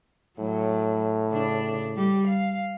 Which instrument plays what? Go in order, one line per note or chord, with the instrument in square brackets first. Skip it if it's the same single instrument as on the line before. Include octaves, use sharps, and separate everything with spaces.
[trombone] A2 [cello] F#3
[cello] C#3 D4
G3 G4
F5